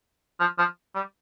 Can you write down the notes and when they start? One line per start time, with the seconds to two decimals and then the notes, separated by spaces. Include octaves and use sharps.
0.40 F3
0.58 F3
0.95 G3